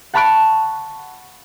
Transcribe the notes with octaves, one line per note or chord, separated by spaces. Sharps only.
F#5 A5 B5 C#6 F#6 D7